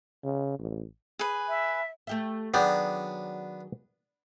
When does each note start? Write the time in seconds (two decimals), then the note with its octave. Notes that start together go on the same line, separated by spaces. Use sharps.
0.24 C#3
0.59 A1
1.19 G#4 B4
1.49 E5
2.07 A3 G4 E5
2.54 D#3 F#3 B3 D4 G#4 D5 G5